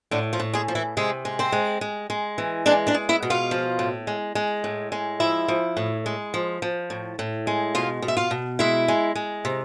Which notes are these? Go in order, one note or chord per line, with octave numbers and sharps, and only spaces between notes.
A2 D3 D4
F3 F4
A2
G#3 G#4
F3
E3 E4
C3 G#3 G#4
G#3
C4 C5
G#3
G#3
G#3
E3
G#3 D4 D5
D4 D5
G#3
E4 E5
B2
F4 F5
F3
A2
G#3
G#3
A2
G#3
F3 E4 E5
F3
A2
G#3
F3
F3
A2
A2
G#3
B2 F4 F5
B2
E5
F4 F5
B2
G#3 E4 E5
G#3
G#3
C3